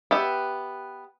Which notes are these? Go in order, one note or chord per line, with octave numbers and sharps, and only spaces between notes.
B3 G4 E5